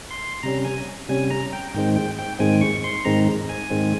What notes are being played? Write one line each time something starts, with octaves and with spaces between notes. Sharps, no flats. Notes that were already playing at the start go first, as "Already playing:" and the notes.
C6
C3 G3 C#4 A#5
G#5
C3 G3 C#4 G#5
A#5
G5
G#2 D#3 G#3 C4 G5
G5
G5
G#2 D#3 G#3 C4 G#5
C#6
C6
G#2 D#3 G#3 C4 A#5
G#5
G#2 D#3 G#3 C4